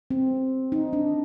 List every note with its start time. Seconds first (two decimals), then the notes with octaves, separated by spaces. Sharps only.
0.11 C4
0.72 D#4
0.93 D4